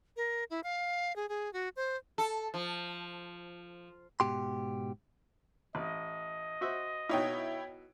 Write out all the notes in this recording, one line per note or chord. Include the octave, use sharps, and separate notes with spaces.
A#4
E4
F5
G#4
G#4
F#4
C5
A4
F3
G#2 B2 G4 C6
A1 D#5
F#4 C5 E5
B2 D#4 E4 C#5 G5